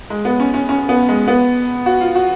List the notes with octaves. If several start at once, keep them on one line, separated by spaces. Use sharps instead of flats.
G#3
B3
C#4
C#4
C#4
B3
G#3
B3
F#4
F4
F#4